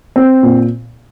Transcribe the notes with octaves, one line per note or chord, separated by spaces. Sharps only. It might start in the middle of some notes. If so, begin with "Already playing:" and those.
C4
A#2